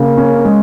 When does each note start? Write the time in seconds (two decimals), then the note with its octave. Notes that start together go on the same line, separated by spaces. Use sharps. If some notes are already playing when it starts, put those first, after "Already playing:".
Already playing: C#3 A#3
0.17 C#4
0.45 G#3